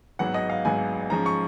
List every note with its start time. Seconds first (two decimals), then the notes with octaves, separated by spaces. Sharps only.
0.19 G#1 G#2 F#3 B3 F#5
0.34 D#5
0.50 F5
0.65 G#1 G#2 F#3 B3 G#5
1.10 G#2 F3 G#3 C#4 A#5
1.26 C#6